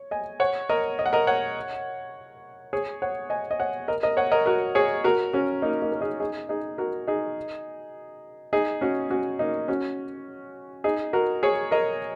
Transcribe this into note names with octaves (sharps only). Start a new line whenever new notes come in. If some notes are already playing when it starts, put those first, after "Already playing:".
Already playing: C#5
D#5 G#5
C#5 F#5
A#4 D#5
D#5
F#5
A#4 D#5
C#5 F#5
G#4 C#5
C#5 F#5
D#5 G#5
D#5
C#5 F#5
A#4 D#5
A#4 D#5
C#5 F#5
A#4 D#5
F#4 A#4
G#4 C#5
F#4 A#4
C#4 F#4
A#3 D#4
A#3 D#4
A#4
D#4 G#4
D#4 G#4
D#4 G#4
F#4 A#4
D#4 G#4
D#4 G#4
C#4 F#4
C#4 F#4
A#3 D#4
C#4 F#4
D#4 G#4
F#4 A#4
G#4 C#5
A#4 D#5